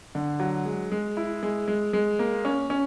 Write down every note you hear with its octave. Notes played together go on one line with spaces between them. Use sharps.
D3
F#3
G#3
G#3
E4
G#3
G#3
G#3
A#3
C#4
C#4